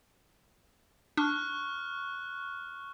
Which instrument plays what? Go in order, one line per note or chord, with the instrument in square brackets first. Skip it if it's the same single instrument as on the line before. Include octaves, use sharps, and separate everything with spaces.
[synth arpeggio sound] D4 [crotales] C#6 F6 F#6